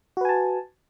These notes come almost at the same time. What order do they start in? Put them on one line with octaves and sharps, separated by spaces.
F#4 B4 G#5 A5